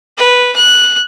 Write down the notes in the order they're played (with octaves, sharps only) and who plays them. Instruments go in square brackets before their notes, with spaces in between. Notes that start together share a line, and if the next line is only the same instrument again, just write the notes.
[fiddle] B4
F#6